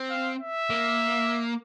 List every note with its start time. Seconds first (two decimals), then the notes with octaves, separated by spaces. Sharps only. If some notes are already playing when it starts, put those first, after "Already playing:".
Already playing: C4
0.10 F5
0.39 E5
0.70 A#3